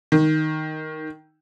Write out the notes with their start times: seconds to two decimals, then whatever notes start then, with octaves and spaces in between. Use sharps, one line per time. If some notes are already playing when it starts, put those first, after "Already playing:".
0.12 D#3